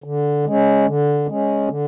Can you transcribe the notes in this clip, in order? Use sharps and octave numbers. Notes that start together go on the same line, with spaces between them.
D3
G#3 C#4
D3
G#3 C#4
D3